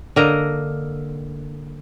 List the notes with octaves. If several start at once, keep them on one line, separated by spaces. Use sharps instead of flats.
D3 A#3 A#4 D#5